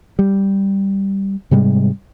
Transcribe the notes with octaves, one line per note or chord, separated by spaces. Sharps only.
G3
G#2 C3 G3 G#3